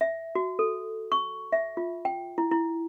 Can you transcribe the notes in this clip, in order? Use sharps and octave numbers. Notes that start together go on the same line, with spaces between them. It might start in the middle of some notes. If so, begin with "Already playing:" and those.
E5
F#4
A4
C#6
E5
F4
G5
E4
E4